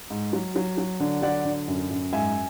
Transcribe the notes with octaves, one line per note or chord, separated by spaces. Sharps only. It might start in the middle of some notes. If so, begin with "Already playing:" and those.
G#2
F#3
F#3
F#3
D3
F#3 D5 F#5
D3
F#2
F#2
G#2 E5 G#5